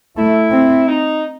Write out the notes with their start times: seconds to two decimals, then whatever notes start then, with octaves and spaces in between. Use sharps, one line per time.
0.17 A3 E4
0.51 C4
0.87 D#4